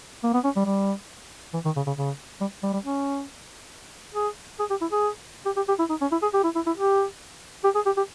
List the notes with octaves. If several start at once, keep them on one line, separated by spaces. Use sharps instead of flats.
A#3
B3
C#4
G3
G3
E3
D#3
C#3
C#3
C#3
G3
G3
G3
C#4
G#4
G#4
G4
E4
G#4
G4
G4
G4
E4
D#4
C#4
E4
G#4
G4
E4
E4
E4
G4
G4
G#4
G4
G4